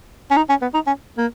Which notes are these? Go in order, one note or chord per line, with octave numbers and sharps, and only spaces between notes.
C#4
D#4
C#4
B3
D#4
C#4
A#3